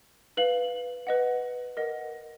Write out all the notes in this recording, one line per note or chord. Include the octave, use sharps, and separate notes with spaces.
B4 F5 F#7
B4 D#5 F#5
A#4 D#5 F#5